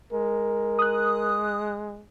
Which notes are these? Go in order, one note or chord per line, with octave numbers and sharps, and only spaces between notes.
G#3 A#4
D#6 F#6